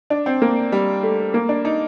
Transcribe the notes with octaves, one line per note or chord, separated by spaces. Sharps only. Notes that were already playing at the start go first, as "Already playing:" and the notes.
D4
C4
A#3
G3
A3
A#3
D4
D#4